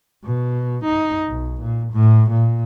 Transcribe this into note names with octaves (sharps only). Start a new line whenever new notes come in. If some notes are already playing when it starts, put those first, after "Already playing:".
B2
D#4
B1
A#2
A2
A#2